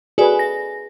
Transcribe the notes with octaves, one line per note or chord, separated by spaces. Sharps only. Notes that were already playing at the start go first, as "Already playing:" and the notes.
F#4 G#4 A4 B4 D5
A#6